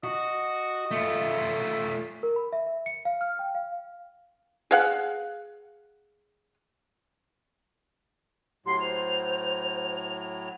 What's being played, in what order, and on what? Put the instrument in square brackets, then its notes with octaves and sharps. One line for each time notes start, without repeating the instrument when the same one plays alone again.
[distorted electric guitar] F#4 [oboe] D#5
[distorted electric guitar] A3 F4
[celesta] A#4
B5
E5
E5
C#7
F5
F6
G5
F5
[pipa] G#4 F5 F#5
[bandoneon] A2 F#3 [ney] G4 [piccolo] C6
[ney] C5 [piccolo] F7